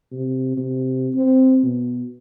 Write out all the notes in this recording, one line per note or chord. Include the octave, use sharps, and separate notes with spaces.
C3
C3
C4
B2